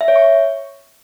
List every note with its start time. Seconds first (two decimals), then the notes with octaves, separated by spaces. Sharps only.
0.01 E5
0.08 C#5
0.16 C#6